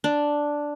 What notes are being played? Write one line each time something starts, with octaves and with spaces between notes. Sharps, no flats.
D4